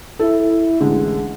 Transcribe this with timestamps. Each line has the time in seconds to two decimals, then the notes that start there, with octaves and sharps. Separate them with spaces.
0.19 E4 A4
0.80 A1 D3 G#3